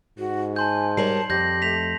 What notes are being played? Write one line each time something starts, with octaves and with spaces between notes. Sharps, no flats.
G#2 F#4
G#5 A5 C6 G6
G3 A#4 C#5 A5 C7 F#7
F2 G4 G6 A#6
A3 B6 F7